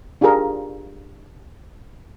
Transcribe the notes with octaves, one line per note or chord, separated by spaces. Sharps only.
D4 F4 G4 G#4 A#4